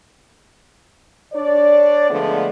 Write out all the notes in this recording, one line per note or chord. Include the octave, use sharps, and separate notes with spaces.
D4 C#5 D5
D3 F3 G#3 A3 B3